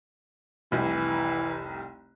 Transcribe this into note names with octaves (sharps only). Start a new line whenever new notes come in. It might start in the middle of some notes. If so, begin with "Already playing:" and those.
F1 C2 E3